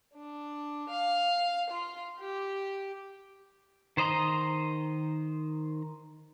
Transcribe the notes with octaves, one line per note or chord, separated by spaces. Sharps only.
D4
F5
F4
G4
D#3 C5 D#5 A#5 C6